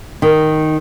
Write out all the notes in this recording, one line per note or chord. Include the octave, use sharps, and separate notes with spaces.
D#3